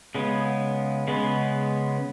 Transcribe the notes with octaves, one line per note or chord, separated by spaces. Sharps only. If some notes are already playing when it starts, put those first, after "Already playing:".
C#3 G#3 B3
C#3 G#3 B3